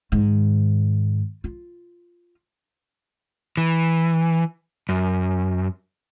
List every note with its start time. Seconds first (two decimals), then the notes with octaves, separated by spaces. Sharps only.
0.12 G#2 D#3
1.44 F4
3.57 E3
4.89 F#2